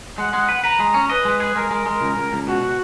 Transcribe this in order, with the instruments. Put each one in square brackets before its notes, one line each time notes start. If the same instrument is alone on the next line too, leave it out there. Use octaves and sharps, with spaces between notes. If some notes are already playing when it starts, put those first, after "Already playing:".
[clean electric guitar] G#3 [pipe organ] F#5
[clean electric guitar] G#3
B4
[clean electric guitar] B4 [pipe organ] A#5
[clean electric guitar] G#3
C#4
[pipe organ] B4 [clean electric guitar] D#5
[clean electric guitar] G#3
G#4
[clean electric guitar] G#3 [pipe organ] A#4
[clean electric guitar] G#3
G#3
C#2
C#2
C#2
[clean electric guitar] B2 [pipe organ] F#4